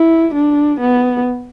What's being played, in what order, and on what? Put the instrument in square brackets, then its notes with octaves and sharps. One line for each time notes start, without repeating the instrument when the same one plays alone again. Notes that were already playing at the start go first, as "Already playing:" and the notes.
Already playing: [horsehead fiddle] E4
D4
B3